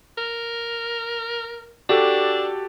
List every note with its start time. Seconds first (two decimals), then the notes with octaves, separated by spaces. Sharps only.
0.18 A#4
1.89 D4 F#4 G4 A4